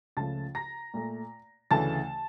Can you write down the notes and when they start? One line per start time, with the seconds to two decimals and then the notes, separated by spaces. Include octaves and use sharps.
0.17 C#2 C#3 F3 A3 A5 A6
0.55 A#5 A#6
0.94 A#2 A3
1.71 D2 C#3 E3 A3 A5 A6